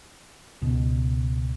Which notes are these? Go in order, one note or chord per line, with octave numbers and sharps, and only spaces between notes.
C#2 B2